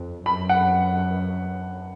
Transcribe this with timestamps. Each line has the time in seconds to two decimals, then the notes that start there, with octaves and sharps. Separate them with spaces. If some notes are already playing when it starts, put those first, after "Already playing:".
Already playing: F2
0.26 F#2 B5
0.49 F#5